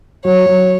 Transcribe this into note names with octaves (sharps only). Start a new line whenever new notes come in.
F#3 C#5
F#3